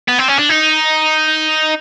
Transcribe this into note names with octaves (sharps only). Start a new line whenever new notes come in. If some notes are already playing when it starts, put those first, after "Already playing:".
B3
C4
C#4
D4
D#4